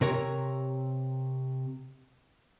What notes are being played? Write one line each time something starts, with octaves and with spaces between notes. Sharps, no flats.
C3 A#4 C#5 A#5